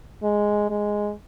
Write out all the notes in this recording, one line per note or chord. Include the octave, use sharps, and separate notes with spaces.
G#3
G#3